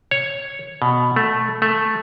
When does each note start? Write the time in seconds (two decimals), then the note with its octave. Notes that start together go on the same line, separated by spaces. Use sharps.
0.11 C#5
0.82 B2
1.16 A3
1.62 A3